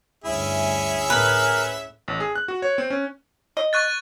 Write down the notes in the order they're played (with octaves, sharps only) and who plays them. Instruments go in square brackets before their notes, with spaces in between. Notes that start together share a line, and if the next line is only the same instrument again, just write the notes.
[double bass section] D2 G2 G3 [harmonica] C#4 G#4 E5 [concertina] E4
[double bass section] A2 [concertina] A#4 [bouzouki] B4
[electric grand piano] A1
G#4
F#6
F#4
C#5
C4
C#4
[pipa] D#5
[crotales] C#6 F#6 A6